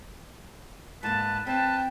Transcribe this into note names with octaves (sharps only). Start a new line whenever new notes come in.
G#2 A#3 B4 A5
C4 B4 G5 A5